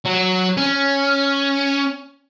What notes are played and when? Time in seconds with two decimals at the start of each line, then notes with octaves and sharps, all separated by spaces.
0.06 F#3
0.57 C#4